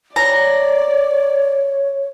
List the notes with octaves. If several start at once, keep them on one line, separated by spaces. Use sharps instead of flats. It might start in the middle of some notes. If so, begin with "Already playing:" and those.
C#5 D5 A#5